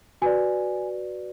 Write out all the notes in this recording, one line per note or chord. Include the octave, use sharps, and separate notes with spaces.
F#4 B4 D5 G#5